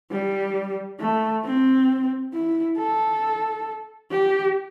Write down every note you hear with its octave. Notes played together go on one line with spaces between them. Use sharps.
G3
A3
C4
E4
A4
G4